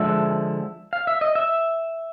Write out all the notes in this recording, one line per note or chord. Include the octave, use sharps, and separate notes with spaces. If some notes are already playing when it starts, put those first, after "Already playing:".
Already playing: D3 F3 G#3 E5
F5
E5
D#5
E5